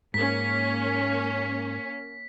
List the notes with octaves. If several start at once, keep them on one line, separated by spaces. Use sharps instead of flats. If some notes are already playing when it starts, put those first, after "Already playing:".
G#2 A#3 C#4 B6